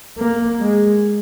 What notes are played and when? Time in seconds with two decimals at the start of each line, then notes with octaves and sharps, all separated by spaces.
0.19 A#3
0.61 G#3